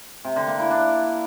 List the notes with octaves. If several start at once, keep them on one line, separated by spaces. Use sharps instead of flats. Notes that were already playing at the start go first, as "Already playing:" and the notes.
C3
D3
A#3
E4
D4